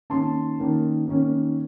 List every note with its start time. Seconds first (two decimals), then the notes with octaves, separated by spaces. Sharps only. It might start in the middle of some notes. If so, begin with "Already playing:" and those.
0.10 D#3 A#3 C#4 A5 C6
0.58 D#3 A#3 C#4
1.06 D#3 A#3 C#4